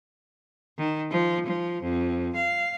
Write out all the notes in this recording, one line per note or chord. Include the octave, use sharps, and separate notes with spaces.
D#3
F3
F3
F2
F5